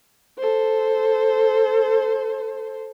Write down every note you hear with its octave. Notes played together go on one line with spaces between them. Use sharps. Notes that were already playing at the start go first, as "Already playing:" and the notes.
A4 C5